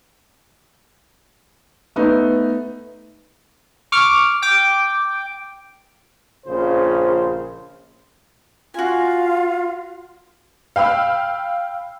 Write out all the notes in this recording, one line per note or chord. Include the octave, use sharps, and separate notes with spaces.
A3 B3 D#4
C#6 D6 F6
G5 D6
A#1 C#3 F4 C5
F4 F#4 G#5
F5 G5 B5 E6 F6